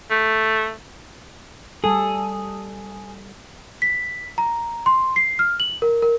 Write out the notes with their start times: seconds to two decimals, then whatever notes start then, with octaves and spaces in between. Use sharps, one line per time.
0.11 A3
1.84 G3 G#4 A4
3.82 B6
4.38 A#5
4.86 C6
5.16 C7
5.39 F6
5.60 F#7
5.82 A#4
6.02 A#4